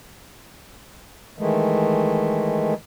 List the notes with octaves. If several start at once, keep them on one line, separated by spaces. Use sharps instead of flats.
D#3 E3 G#3 A3